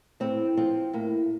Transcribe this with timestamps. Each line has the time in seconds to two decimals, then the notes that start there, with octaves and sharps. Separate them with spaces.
0.20 A2 C4
0.57 F3 C4
0.93 A2 A#3